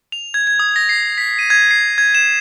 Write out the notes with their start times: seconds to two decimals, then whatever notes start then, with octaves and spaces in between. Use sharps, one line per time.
0.12 F7
0.34 G#6
0.47 G#6
0.59 D#6
0.76 A#6
0.89 C7
1.18 B6
1.39 D#7
1.50 G#6
1.71 C7
1.98 G#6
2.15 E7